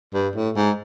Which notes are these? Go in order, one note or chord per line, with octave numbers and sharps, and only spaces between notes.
G2
A2
G#2